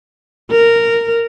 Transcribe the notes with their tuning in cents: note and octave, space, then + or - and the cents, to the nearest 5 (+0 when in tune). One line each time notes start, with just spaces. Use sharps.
A#4 -10